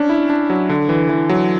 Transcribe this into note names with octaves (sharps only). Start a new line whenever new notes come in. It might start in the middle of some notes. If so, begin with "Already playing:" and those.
Already playing: C#4 D4
E4
D4
F#3
D3
E3
E3
F#3